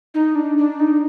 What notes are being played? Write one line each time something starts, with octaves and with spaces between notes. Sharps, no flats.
D#4
D4
D4
D#4